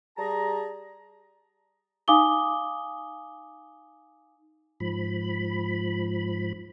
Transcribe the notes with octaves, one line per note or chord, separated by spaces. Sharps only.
G3 G#4 A5 A#5
D#4 F5 G#5 D6 D#6 G7
G#2 F3 B5